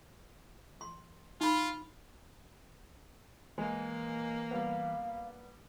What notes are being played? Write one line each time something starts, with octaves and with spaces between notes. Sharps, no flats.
C6
D#4 F4 B5
E3 G#3 A#3
G3 B3 F5